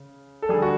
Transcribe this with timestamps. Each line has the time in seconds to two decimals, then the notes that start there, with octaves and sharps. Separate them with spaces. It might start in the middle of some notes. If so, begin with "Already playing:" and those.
Already playing: C#3
0.42 A4
0.49 G3 G#4
0.53 D3
0.62 F#4